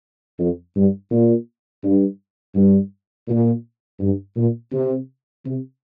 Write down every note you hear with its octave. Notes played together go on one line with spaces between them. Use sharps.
F2
G2
A#2
G2
G2
A#2
G2
A#2
C3
C3